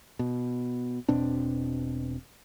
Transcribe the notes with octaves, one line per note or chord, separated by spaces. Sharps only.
B2
E1 B2 C4 D4